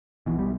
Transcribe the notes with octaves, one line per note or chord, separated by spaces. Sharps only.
B1 B2 E3
G3